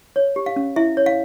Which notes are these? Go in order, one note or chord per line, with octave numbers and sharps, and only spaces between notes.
C#5
G4
F5
C#4
E4 E5
C#5
F5